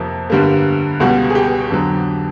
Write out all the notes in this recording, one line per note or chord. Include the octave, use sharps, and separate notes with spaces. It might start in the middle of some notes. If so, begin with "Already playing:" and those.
Already playing: F2 C3 F3 A#3
G2 D3 G3 A#3
C#2 B2 G3 F#4
G#4
G4
F2 D3 F#3